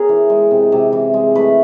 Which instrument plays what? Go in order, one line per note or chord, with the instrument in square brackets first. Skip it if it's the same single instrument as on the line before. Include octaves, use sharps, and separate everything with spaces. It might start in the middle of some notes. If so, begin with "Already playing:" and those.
Already playing: [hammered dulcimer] B3 G#4 A#4 C#5
E3
G#3
C3
C3
E3
G#3
A3 B4